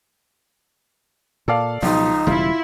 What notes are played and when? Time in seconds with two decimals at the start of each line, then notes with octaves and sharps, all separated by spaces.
1.48 A#2 A4 D5 F5
1.83 C#2 B2 F3 F#3 D#4
2.27 E1 C#3 G3 E4 F4